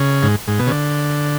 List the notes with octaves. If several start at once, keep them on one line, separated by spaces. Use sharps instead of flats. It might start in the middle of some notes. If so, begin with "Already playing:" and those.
Already playing: C#3
G#2
G#2
B2
C#3
D3